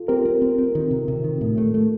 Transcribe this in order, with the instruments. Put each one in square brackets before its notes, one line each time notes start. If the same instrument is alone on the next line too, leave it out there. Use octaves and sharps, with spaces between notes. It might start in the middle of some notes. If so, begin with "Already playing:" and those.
Already playing: [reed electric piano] F4 A4
[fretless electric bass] C4 [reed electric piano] G4 A#4
[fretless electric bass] C4
C4
C4
D#3
C3
C3
D#3
A2
A3
A3